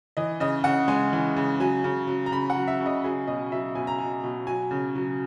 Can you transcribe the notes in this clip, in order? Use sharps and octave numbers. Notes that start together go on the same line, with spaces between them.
E3 D#5
C#3 D#5
C#3 F#5
G#3 G#5
E3
C#3
F#3 G#5
C#3
F#3
A#5
C#3 B5
F#5
F#3
E5
C#3
D#5
F#3 G#4
B2 D#5
F#3 E5
B2 G#5
A#5
F#3 G#5
B2
F#3 G#5
C#3
F#3